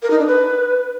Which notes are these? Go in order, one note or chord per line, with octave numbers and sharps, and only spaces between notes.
A#4
D#4
D4
B4